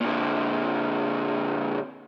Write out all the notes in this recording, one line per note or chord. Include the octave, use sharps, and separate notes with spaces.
A#2 D3